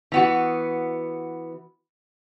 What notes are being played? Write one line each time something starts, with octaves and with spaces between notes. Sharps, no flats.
E3 B3 F#4